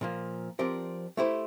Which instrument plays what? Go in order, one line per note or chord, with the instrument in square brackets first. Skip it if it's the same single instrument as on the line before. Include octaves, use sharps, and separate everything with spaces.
[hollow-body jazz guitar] A#2 F3 A#3
F3 C4 G4 A#4 D5
A3 E4 G4 C5